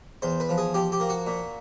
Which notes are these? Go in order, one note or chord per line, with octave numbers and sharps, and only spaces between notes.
E2 C5
B4
F3
G#4
F3 G4
G4
A#3
F#4
A#2